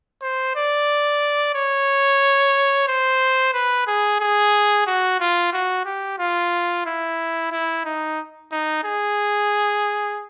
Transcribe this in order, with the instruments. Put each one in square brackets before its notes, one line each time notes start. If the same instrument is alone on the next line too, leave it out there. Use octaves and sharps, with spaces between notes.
[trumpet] C5
D5
C#5
C5
B4
G#4
G#4
F#4
F4
F#4
G4
F4
E4
E4
D#4
D#4
G#4